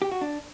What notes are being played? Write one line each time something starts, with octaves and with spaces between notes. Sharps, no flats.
G4
F#4
D4